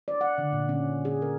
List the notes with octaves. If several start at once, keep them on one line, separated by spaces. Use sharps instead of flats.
D5
F#5
D3
A#2
C#4
G#4
A#4